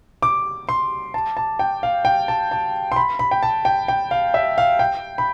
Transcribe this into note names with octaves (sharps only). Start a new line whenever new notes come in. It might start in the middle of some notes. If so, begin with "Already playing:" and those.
D6
C6
A5
A5
G5
F5
G5
A5
A5
C6
B5
B5
G5
A5
G5
G5
F5
E5
F5
G5
B5